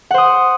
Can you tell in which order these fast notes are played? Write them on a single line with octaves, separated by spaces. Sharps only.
F#5 C5 D#6